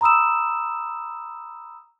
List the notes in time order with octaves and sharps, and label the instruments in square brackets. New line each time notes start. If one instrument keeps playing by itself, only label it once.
[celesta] A#5 B5 D#6 E6 E7